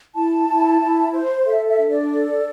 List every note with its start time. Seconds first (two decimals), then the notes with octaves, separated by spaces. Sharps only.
0.15 E4 A5
0.48 E4
0.81 E4
1.13 C5
1.45 A4 E5
1.68 E5
1.79 D4
1.89 D5
2.12 A4